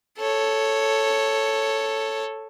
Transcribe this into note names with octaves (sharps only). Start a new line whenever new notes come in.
A4 C#5